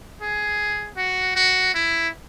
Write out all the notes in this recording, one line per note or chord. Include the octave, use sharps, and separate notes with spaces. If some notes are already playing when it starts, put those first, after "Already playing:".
G#4
F#4
F#4
E4